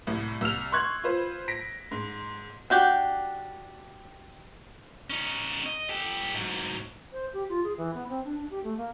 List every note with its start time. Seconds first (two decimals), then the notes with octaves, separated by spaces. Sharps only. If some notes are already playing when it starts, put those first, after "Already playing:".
0.07 C2 A2
0.41 C2 E6 F6 F7
0.72 C6 C#6 F#6 G#6
1.04 F4 B4 C5
1.48 A#6 B6 D7
1.91 G#2
2.70 D4 F#4 G4
5.10 C#4 D#4
5.66 D#5
5.89 G4 A4
6.35 G#2 F#3
7.13 C5
7.33 G4
7.49 F4
7.64 G#4
7.78 E3
7.94 B3
8.09 C4
8.24 D4
8.38 D4
8.51 G4
8.64 A3
8.77 A#3